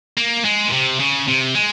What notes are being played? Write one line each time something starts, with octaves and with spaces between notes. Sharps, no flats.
A#3
G#3
A#2
C3
C#3
C3
G#3